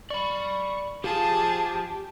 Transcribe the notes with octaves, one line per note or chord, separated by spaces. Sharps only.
D5 B5 C#6
F3 F4 G4 G#4 A5